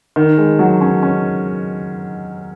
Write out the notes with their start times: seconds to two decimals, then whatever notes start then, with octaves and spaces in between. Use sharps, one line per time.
0.16 D#3
0.38 G#3
0.59 F#3
0.81 C#4
1.03 C#4